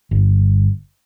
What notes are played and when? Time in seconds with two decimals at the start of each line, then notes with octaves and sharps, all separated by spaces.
0.11 G1